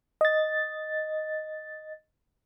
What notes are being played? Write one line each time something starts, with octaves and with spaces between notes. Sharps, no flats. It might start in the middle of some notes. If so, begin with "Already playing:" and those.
D#5 A6